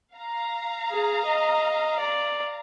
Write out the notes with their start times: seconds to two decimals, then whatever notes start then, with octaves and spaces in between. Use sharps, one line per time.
0.16 F5 A#5
0.90 G#4
1.25 D#5
1.99 D5